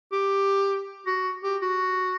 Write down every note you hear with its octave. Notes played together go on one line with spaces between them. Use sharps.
G4
F#4
G4
F#4